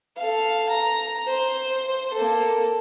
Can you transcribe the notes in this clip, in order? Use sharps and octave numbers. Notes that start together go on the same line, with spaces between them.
A4 F5
A#5
C5
A#3 A4